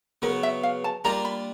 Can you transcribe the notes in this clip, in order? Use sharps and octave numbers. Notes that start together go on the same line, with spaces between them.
C#3 F#3 B3 A#4
E5
F5
A5
G3 A#3 D4 F4 A#4 A#5
B5